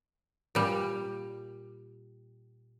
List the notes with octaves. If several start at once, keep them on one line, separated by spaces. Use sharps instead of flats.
A#2 G3